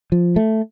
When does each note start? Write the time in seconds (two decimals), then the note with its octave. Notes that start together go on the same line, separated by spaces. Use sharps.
0.12 F3
0.36 A3